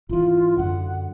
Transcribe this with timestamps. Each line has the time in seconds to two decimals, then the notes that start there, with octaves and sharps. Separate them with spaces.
0.09 G#1 E3 F4
0.57 F#2 D3 F#5